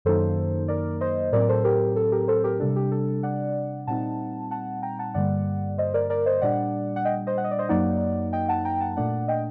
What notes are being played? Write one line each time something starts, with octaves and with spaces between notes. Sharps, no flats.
F#2 D#3 F#3 A#3 D#4 A4 C5
A#4 D5
C5 D#5
A2 F#3 C4 A#4 D5
A4 C5
G4 A#4
A4
G4 A#4
A4 C5
G4 A#4
C3 G3 D4 A4
G4
A4
D5 F#5
A#2 G3 C4 D#4 F#5 A5
F#5 A5
G5 A#5
F#5 A5
G2 D3 G3 A#3 D5 F#5
C5 D#5
A#4 D5
A#4 D5
C5 D#5
A#2 G3 D4 D5 F#5
F#5
D#5 G5
C5 D#5
F#5
D#5
D5
C5 D#5
F#2 F#3 A#3 D#4 D5 F#5
D#5 G5
F#5 A5
G5 A#5
F#5 A5
A#2 A3 D4 D5 F#5
D#5 G5